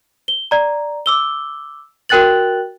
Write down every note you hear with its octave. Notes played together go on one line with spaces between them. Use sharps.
G7
D5 A#5
D6 E6 G7
F#4 A#4 G5 F#6 A6 F#7